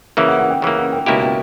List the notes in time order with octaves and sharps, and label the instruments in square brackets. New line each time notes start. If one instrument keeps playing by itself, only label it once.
[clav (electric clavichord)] C#3 E3 A#3 [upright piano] E5
[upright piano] F#5
F#5
G5
[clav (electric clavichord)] C#3 E3 A#3
[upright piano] F#5
G5
[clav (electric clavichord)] C#2 B2 A#3 E4 G4
[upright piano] G5